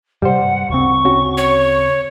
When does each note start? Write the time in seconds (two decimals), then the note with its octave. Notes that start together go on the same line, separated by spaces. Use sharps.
0.22 G2 C3 G3 C5 F#5
0.70 D2 C#3 C4 C#6
1.05 C#4 F#4
1.37 C#5